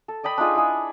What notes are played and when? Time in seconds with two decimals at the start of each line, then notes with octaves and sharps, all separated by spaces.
0.08 A4
0.23 D5 D#5 G5 B5
0.38 D4 D#4 F4 G#4
0.55 E4 G#4